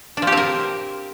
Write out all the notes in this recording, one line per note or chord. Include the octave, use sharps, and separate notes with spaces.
D4
F3
G4
C4
A#4